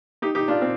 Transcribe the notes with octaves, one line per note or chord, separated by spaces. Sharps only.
D#4 G4
D#4 G4
D4 F4
C4